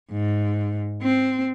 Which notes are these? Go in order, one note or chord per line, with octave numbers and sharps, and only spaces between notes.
G#2
C4